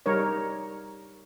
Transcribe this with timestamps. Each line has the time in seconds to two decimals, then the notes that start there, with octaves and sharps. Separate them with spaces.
0.06 G3 D#4 A#4 C#5